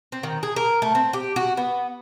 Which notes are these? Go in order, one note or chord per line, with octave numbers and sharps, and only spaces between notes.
C4
D#3
G#4
A#4
A3
C4
G4
F#4
B3